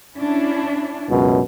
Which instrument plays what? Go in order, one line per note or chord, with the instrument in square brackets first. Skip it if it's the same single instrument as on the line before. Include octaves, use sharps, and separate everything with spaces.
[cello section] C#4 D4 E4
[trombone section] C#2 F#2 B2